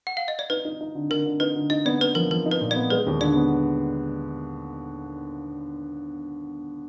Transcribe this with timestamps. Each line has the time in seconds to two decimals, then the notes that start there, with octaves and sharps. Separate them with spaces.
0.07 F#5
0.17 F5
0.28 D#5
0.39 D5
0.50 D#4 B4
0.65 D#4
0.81 D#4
0.95 D3
1.10 D3 A#4
1.26 D3
1.40 D#4 B4
1.56 D3
1.70 D#4 D#5
1.85 B3 D5
2.00 B3 B4
2.15 F3 A#4
2.31 F3 A#4
2.46 D#4
2.51 B4
2.61 A#2
2.71 D5
2.76 B3
2.90 G#3 B4
3.07 D#2
3.21 D3 D5
3.36 B3